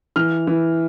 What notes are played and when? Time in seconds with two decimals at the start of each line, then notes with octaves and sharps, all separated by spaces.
0.16 E3 F6
0.47 E3